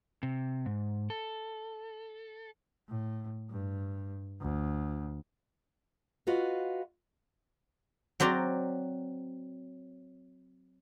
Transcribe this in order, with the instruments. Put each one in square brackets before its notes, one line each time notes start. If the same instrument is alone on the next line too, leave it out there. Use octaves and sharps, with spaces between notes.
[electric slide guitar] C3
G#2
A4
[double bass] A2
G2
D2
[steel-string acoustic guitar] F4 F#4 B4 D#5 F5
[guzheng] F#3 C4 F#4 D5 A#5